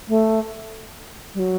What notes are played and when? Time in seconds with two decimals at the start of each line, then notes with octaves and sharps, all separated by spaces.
0.08 A3
1.34 G3
1.39 F#3